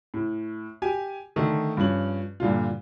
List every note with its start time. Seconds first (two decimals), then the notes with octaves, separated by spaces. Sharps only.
0.14 A2
0.82 G4 G#5
1.36 D3 D#3 A3
1.77 G2 F3 C#4 F#7
2.40 G2 A#2 D3 F4